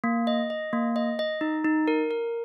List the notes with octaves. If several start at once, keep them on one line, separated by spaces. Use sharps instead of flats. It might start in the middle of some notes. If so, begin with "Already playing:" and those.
A#3
D#5
D#5
A#3
D#5
D#5
D#4
D#4
A#4
A#4